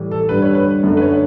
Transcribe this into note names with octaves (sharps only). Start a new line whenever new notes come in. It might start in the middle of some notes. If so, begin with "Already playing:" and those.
Already playing: A2 E3 G3
A4
G2 D3 G3 B4
C#5
B4
F#2 D3 A3
B4
C#5